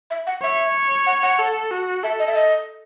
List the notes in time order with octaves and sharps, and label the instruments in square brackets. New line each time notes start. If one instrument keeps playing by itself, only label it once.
[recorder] E5
F#5
[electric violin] C#5 [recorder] E5
[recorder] F#5
F#5
[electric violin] A4
F#4
[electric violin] A4 [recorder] E5
[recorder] D#5
E5
D#5